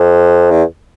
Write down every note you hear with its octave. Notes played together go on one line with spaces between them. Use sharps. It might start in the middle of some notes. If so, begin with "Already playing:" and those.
Already playing: F2
E2